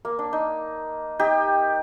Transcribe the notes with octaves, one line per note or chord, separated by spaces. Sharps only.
A#3
D4
D#4
D#4 G4